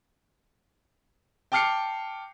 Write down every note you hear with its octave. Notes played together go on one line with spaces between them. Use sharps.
G5 A5 D6 F6 C7 C#7